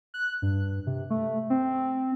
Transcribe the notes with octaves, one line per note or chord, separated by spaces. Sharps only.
F#6
G2
C3
A3
C4